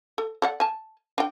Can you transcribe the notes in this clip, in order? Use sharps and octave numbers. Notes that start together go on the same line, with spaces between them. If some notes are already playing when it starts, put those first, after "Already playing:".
A4
A4 D5 F#5
G#5 A5
D4 G5